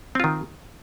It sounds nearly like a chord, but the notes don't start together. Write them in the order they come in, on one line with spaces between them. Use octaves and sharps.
C4 F4 D#3